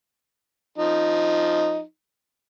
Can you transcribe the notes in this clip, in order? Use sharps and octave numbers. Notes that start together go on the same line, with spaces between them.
F3 D#4